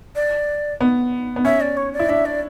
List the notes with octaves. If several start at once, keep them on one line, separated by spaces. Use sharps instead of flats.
D5
B3
B3
C#4 E5
D5
C#5
D5
E4
D4 E5
D5